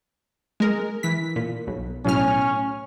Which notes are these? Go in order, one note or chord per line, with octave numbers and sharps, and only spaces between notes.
G#3 A#4
E3 B6
A#2
B1
B1 A2 C#4 F6